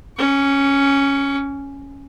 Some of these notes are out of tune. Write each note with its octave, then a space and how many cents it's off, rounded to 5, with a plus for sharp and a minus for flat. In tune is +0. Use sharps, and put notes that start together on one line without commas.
C#4 +0 C#6 +30